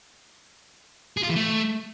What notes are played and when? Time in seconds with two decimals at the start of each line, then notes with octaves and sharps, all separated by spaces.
1.17 G#4
1.23 F4
1.30 E3
1.36 A3